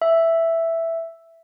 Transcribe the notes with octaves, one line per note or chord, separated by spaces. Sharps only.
E5